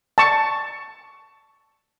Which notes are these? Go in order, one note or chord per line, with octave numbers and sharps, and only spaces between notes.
A5 C#6